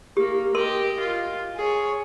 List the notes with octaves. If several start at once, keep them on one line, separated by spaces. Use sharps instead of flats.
A#3 G4
G4 A#4 D#5 C6
F4
G#4 C#5